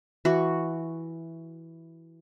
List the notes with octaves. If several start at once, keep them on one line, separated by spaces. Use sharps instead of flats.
E3 F#4